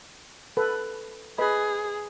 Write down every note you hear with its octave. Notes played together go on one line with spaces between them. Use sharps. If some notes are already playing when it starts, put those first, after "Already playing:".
A4 B4
G#4 B4 D#5 B5